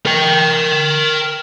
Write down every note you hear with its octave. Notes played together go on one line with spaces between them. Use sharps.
A#4 G5